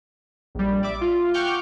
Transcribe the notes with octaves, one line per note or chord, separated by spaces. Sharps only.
A#1 G3
D5 E5 D6
F4
F#5 G5 C#6 D6 F6 G6